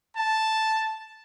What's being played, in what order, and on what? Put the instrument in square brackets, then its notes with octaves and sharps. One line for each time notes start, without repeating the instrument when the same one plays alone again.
[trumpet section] A5